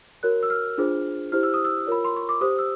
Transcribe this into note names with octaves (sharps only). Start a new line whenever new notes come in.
F#4 A#4 C#5 F#6
E6
F6
D4 F4 G#4 C5
E4 G4 C5 F6
E6
D#6
E6
F4 A#4 C#5 B5
C6
C#6
D6
G4 C5 D#6
E6